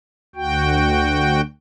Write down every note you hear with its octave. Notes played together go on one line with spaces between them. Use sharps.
D2 F#4 G5